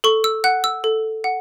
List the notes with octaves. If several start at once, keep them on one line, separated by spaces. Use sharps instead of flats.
A4 C#6
E6
F#5 F#6
E6
A4
F#5